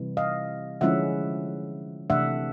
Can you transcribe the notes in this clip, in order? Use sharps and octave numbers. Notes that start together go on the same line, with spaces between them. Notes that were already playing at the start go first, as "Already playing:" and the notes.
Already playing: C3 E3 G3
D#5 F5
D3 F3 G#3 C#4 E4 E5 F#5
C3 E3 A3 D4 E5 F#5